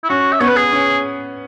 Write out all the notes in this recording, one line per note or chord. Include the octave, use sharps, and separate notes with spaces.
E4
C#4 F#4
E5
B3 C#5
B4
G#4
C#4